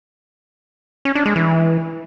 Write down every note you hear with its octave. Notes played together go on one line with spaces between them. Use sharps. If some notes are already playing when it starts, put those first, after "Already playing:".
C#4
D4
G#3
E3